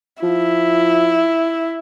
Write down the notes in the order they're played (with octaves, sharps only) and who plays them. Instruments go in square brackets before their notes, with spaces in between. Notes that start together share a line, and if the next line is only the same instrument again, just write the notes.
[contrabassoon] F3 [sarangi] E4